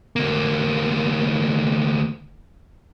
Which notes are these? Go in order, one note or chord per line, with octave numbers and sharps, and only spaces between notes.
D2 A#3